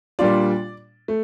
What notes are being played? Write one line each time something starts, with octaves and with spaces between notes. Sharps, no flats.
A#2 G3 D4 F4 D5
A3